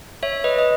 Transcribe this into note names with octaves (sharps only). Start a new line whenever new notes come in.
C#5 E5
B4 D#5
D#5